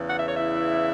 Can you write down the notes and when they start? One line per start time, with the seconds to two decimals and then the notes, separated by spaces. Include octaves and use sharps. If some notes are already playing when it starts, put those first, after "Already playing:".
Already playing: E2 C#3 E3
0.09 F#5
0.17 E5
0.27 C#5
0.36 E4 E5